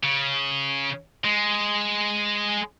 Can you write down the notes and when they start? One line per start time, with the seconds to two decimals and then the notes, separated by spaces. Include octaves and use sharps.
0.04 C#3
1.24 G#3